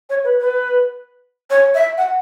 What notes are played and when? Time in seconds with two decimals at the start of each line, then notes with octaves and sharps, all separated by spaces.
0.09 C#5
0.24 B4
0.40 B4
1.50 C#5
1.75 E5
1.97 F#5